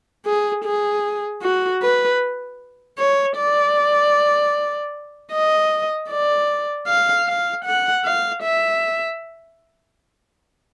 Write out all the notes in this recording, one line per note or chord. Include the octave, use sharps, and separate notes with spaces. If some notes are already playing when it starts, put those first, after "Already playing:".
G#4
G#4
F#4
B4
C#5
D5
D#5
D5
F5
F5
F#5
F5
E5